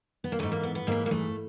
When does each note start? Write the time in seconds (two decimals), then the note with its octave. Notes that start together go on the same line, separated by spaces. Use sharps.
0.24 B3
0.32 A#3
0.39 G#2 E3 A3
0.52 A#3
0.63 B3
0.75 B3
0.87 G#2 E3 A#3
1.06 A#3
1.11 A3